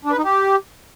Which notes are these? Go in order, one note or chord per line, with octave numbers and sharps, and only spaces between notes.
D4
B4
D#4
G4